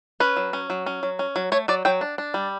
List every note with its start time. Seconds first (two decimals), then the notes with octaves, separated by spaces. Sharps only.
0.20 C#4 B4
0.37 F#3
0.53 C#4
0.70 F#3
0.86 C#4
1.03 F#3
1.19 C#4
1.36 F#3
1.52 A3 C#5
1.68 F#3 D5
1.85 F#3 G5
2.01 D4
2.18 D4
2.34 G3